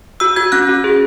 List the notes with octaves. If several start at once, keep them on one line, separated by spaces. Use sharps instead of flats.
F#4 E6
F#4 G#6
C#4 F#6
F#4
G#4